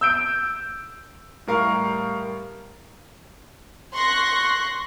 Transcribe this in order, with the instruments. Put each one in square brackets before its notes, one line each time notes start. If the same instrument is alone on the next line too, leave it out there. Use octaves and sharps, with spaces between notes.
[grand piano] E6 G6 D7
[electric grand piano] A2 G3 A#4 F5 C#6 C7
[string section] C6 C#6 F#6 A#6